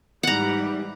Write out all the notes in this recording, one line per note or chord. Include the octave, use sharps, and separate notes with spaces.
G#2 E3 G3 D#4 F#5 A#5